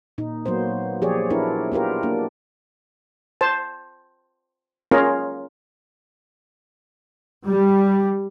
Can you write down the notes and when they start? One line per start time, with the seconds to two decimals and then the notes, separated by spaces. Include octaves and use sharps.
0.18 A#2 D#4
0.46 F#3 A#3 B3 C5
1.02 F3 G4 G#4 C#5 D5
1.30 B3 D4 E4 A#4
1.72 B3 F4 G4 A#4
2.03 A#3 D4
3.41 C5 A5
4.91 C#4 F4 G#4 A#4
7.48 G3